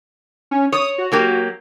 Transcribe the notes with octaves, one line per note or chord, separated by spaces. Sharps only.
C#4
C#5 D#6
F#4
F#3 A#3 G4